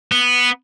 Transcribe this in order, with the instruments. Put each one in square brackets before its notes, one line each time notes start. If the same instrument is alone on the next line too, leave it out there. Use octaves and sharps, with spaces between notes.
[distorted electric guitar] B3